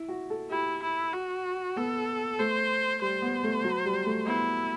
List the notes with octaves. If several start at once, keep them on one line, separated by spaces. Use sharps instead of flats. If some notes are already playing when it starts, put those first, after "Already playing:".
Already playing: E4
F#4
A4
E4 G4
E4
F#4
B3 A4
A3 C5
G3 C5
B3
A3
F#3
G3
A3
B3 E4